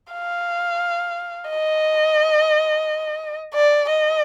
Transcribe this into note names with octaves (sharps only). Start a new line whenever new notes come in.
F5
D#5
D5
D#5